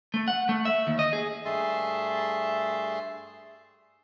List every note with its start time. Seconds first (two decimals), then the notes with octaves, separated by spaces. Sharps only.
0.14 A3
0.28 F#5
0.49 A3
0.65 E5
0.87 D#2
0.99 D#5
1.13 G#4
1.45 G2 A3 G#4 E5 A5 C6